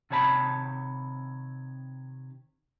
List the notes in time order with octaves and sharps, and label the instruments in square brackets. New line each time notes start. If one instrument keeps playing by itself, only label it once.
[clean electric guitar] C3 D#3 C#5 A5 B5